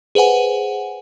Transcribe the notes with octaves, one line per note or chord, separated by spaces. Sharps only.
G#4 B4 C5 F#5 G#5